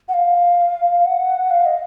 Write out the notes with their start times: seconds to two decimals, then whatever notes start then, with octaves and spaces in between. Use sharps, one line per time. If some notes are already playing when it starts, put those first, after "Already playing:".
0.08 F#5
0.14 F5
1.05 F#5
1.50 F5
1.66 D#5